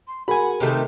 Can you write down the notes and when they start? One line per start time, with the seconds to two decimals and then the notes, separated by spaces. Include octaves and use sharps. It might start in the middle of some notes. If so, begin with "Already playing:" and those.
0.07 C6
0.28 F#4 G#4 A#4 F#5 G#5 B5
0.60 C3 D#3 A3 G4